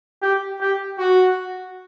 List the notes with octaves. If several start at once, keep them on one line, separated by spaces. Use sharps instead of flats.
G4
G4
F#4